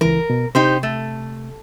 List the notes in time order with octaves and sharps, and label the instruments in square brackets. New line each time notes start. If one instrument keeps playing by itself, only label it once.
[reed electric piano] C#2 E3 [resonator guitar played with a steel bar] A#4
[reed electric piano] B2
[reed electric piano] C3 [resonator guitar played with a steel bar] D#4 G4 C5
[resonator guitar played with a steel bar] A3